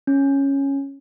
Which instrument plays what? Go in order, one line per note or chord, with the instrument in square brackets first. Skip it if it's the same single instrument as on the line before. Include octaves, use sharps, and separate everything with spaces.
[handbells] C#4